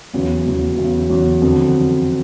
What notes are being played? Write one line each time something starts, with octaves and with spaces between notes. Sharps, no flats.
E2 C#3 F#3
E2 C#3 F#3
E2 C#3 F#3
E2 C#3 F#3
F2 D3 F#3